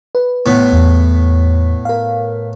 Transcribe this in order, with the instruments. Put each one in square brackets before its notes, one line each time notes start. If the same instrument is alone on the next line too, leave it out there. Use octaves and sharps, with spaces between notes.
[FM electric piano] B4
[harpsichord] A2 B3
[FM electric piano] E2
A#4 F5